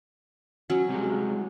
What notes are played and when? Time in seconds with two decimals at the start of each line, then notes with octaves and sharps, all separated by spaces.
0.70 F#3 C#4
0.89 C3 G3 G#3